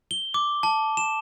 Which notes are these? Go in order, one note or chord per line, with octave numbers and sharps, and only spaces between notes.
G7
D6
A5
E7